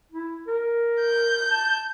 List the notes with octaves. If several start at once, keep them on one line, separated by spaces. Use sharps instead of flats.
E4
A#4
G6
A5